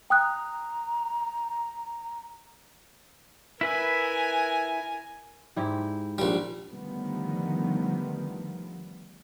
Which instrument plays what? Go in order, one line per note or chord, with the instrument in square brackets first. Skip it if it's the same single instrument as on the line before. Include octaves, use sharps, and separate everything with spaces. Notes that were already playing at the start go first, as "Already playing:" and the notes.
[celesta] G5 D#6 F#6 [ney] A#5
[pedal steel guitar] E4 B4 E5 [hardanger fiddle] A#4 G#5
[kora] G#2 E4 G4
[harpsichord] A#1 G3
[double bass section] D3 D#3 F3 G3 A3 B3